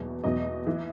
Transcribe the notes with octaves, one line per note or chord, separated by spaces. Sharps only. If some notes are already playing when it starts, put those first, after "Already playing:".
Already playing: E2 B2 F#3
E2 B2 F#3 D#5
E3